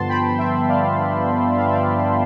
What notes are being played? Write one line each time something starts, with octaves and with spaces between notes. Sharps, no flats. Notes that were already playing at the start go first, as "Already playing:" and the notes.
Already playing: G2 D3 F3 B3 A5 C6
G5 B5
E5 G5
D5 F5
F5
E5
D5 F5